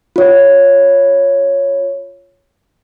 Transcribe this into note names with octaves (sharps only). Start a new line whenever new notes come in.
F4 C#5